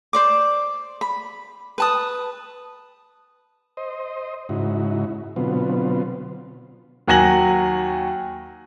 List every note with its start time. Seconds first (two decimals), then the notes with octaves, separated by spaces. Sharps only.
0.13 C5 D5 D6
1.01 B5
1.78 B4 A5 D#6
3.77 C5 D#5
4.49 G#2 C#3 D#4 E4 F#4
5.36 B2 D3 F#3 B3 C4 F4
7.08 D#2 F#3 F#5 G#5 A#6 F#7